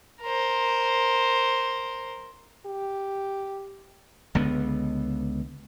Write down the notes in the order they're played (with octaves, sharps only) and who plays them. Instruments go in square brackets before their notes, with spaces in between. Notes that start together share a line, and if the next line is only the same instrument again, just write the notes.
[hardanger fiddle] A#4 C5
[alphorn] G4
[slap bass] C#2 D3 B3